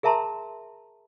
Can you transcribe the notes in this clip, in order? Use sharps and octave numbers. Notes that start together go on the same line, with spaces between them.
G#4 A#4 E5 A5 A#5 C6